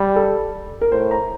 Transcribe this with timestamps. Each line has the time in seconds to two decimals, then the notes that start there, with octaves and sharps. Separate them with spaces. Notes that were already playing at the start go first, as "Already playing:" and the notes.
Already playing: G3
0.16 A4
0.81 A#4
0.92 A2 C5
1.11 A#5